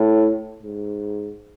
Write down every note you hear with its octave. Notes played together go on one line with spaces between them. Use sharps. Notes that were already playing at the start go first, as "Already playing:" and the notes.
Already playing: A2
G#2